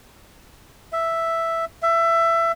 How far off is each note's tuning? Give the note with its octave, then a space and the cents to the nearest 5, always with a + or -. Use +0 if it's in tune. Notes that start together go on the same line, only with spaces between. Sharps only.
E5 +0
E5 +20